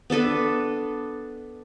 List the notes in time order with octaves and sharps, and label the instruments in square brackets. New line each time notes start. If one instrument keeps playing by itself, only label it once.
[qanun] B3 D4 A4 B4